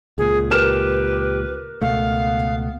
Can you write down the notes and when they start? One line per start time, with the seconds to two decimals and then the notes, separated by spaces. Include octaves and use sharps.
0.18 C#2 A#2 G#4
0.51 G4 A#4 B4 F6 E7
1.82 C#2 B2 A3 B3 F5